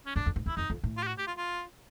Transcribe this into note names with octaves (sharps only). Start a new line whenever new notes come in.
C#4
F#2 D4
F2
G2
E2 E4
F2 D#4
F2
A2
F4
G4
F#4
G4
F4
F4